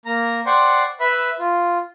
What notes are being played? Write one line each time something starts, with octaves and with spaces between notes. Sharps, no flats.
A#3 A#5
C5 D5 F#5 G5 C6 C#6
B4 E5 B5 E6
F4